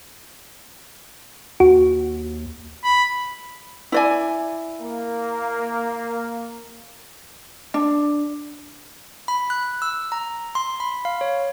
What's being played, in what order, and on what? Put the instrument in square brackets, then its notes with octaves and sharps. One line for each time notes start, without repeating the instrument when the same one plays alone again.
[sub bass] D#2 [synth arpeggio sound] F#4
[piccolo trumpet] B5
[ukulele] E4 D5 G#5
[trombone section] A#3
[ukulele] D4
[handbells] B5
F#6
E6
A#5
C6
B5
F5
C#5